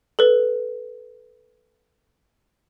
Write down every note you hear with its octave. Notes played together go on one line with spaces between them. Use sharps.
A4 B4